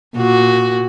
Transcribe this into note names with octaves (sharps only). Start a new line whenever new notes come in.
A#2 F#4